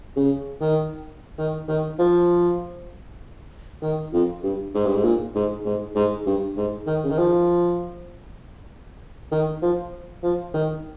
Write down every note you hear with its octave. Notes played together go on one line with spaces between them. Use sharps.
C#3
D#3
D#3
D#3
F3
D#3
F2
G2
G#2
G2
G#2
A#2
G#2
G#2
G#2
G2
G#2
D#3
C#3
D#3
F3
D#3
F3
F3
D#3